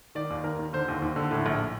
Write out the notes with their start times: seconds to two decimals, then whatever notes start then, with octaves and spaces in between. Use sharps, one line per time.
0.15 D#3 D5
0.30 D#2
0.44 D#2 A#4
0.59 D#3
0.73 D3 C5
0.88 D#2
1.02 D#2
1.16 D3
1.31 A2
1.46 A#1